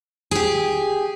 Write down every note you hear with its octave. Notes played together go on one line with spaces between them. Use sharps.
G4 G#4